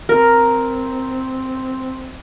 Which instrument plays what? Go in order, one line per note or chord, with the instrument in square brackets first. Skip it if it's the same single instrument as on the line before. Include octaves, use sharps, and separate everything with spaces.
[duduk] C4 [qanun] A#4